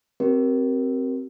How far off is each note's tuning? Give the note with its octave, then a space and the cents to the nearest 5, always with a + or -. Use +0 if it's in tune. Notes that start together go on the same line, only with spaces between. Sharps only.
C4 +0 G4 -40 A#4 +15